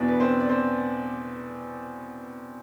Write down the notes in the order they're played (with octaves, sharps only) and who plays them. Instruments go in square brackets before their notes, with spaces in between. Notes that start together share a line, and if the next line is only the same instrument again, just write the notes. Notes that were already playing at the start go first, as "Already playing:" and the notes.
Already playing: [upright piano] E2 B2 D4 D5
B4
C4 C5
D5
C4 C5